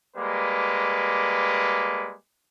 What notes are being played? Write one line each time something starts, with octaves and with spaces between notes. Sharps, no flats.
G3 G#3 A#3 B4